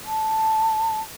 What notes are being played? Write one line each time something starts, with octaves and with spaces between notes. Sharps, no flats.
A5